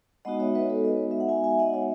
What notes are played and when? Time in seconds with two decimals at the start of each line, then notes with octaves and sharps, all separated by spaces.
0.25 G#3 B3 D#4 F#4 D#5 F#5
0.40 C#5 E5
0.55 B4 D#5
0.69 A4 C#5
0.85 B4 D#5
1.11 E5
1.20 F#5
1.29 E5 G#5
1.44 E5 G#5
1.59 D#5 F#5
1.69 F#5
1.73 C#5 E5